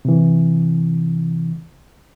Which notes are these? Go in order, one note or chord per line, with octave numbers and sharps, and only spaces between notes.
C3 E3